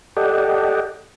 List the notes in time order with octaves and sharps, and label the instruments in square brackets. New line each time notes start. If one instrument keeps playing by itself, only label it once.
[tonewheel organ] G4 A4 D5 D#5 F#5 G5